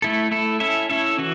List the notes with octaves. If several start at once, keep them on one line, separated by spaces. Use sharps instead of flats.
A3 E4 A4
A3 E4 A4
C#4 E4 A4 E5
C#4 E4 A4 E5
E3 F#4